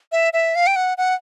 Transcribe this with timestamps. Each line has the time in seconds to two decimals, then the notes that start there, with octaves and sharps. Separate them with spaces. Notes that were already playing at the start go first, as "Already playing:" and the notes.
0.12 E5
0.33 E5
0.55 F5
0.67 G5
0.76 F#5
0.98 F#5